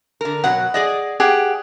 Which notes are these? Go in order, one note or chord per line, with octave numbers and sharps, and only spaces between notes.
D3 A#4
B2 F#3 F#4 F#5
G#4 D5 D#5
G4 G#4 F#5 G5